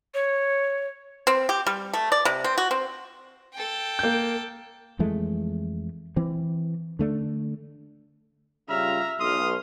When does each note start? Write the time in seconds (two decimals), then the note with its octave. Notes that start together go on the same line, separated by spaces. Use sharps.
0.14 C#5
1.27 C4
1.49 G4
1.67 G3
1.93 A3
2.12 D5
2.25 C3
2.44 C4
2.58 F#4
2.71 C4
3.53 A4 G5
3.99 A#3 G6
4.99 F2 E3 G#3 A3
6.16 E3 C4
6.99 D3 A3 D4
8.69 C#3 G3 F4 E5 A#5 F6
9.20 B1 C6 D#6 F6